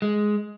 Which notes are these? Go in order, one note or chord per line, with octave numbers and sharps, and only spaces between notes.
G#3